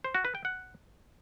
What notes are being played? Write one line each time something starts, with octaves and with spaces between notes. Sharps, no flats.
C5
F#4
B4
G5
F#5